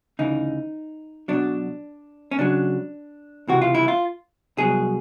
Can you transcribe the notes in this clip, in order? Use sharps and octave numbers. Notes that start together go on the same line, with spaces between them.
D2 C#3 E3 D#4
B1 B2 F#3 D4
C#4
C#2 C#3 F#3 D4
C#2 C3 E3 F#4
F4
E4
F4
C2 B2 F#3 G#4